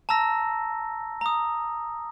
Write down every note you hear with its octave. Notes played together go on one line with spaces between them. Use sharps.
A5 A#5 E6 A#6
A#5 D#6